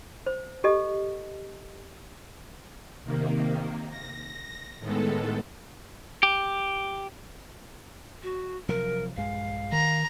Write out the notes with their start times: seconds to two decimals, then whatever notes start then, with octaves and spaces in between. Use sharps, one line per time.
0.26 C5
0.64 G4 A4 D#5
3.04 C3 D#3 A#3
3.90 A#6
4.79 A2 D#3 G#3 B3 A4
6.23 G4
8.23 F#4
8.69 C3 F3 F#3 A#4
9.16 A#1 G2 G#3 F5
9.72 D#3 A#5